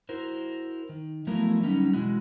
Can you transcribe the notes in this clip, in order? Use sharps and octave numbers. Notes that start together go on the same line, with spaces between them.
E4 F#4 A#4 C5
D#3
F3 F#3 A3 B3 E4 A#4
D3 F#3 G3 C#4 D#4
B2 E3 G#3 E4 F#4